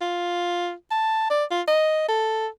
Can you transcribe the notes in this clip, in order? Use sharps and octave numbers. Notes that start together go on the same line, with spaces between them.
F4
A5
D5
F4
D#5
A4